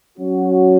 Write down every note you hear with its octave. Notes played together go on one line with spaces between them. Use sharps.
F#3 C#4 F#4